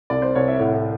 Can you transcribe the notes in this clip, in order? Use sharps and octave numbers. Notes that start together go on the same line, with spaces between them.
C2 D5
C5
C2 C#5
E5
A2 F#5